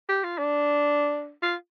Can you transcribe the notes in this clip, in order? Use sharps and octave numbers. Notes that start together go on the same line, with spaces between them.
G4
F4
D4
F4